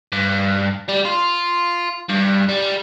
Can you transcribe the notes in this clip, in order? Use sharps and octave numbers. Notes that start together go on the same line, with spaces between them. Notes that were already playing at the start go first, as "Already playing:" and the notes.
G2
G3
F4
G2
G3